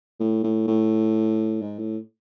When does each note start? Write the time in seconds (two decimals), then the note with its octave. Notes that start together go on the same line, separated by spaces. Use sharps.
0.20 A2
0.44 A2
0.67 A2
1.62 G#2
1.79 A2